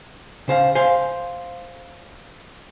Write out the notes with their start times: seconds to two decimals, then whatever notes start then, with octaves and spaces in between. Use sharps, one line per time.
0.48 C#3 C5 F5
0.75 C5 F5 G#5